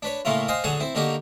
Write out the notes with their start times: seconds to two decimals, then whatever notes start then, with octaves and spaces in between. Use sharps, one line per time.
0.02 D4 B4 C#5
0.25 A2 C#3 A3 A#3 E4 F4
0.48 C5 D#5 F5 G5 G#5
0.64 D3 F#3 G#4 F#5 G#5 A5
0.80 C4 E4
0.95 D3 A#3 D#4 F#4 G4